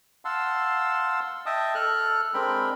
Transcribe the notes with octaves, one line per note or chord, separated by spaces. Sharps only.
F5 F#5 A5 C6 E6
D#5 E5 G5 A5 D#6
A4 F6 F#6
G#3 C4 D4 A#4 G5 B5